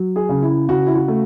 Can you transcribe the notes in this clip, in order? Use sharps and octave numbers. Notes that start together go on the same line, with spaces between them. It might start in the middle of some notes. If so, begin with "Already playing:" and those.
Already playing: F#3
G#4
C#3
E4
C#3 F#4
E4
F#4
A3